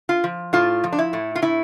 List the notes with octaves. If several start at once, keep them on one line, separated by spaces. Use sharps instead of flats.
F4
F3
A2 F4
F3
D4
E4
A2
F4
A2 E4